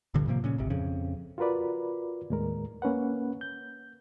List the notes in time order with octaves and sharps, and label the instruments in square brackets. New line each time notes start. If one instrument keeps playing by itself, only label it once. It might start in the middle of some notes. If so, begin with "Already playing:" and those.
[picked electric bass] D1 A#1 G2 D3
A2 C3 F3 A#3
A#2 C#3 C#4
G#1 C#2 C3
F2 C#3
[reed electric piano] F4 F#4 A#4 B4 D5
D#2 A2 G#3 A#4
A#3 C#4 B4 F#5
G6